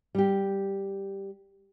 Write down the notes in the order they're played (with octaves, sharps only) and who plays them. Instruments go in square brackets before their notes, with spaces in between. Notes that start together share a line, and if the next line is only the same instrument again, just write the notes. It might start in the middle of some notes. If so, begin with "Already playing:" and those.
[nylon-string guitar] G3 G4